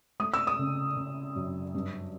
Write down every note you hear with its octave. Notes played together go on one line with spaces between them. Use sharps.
A3 D#6
E6
D#6
C#3
C#3
F#2
G2